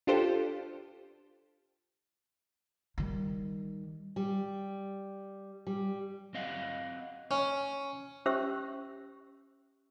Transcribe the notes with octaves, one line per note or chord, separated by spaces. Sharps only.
D4 F4 G4 A4 C5
D#3 G3
G3
G3
C4 D#5 F5 F#5
C#4
C#4 G4 C5 E5 C#6 E6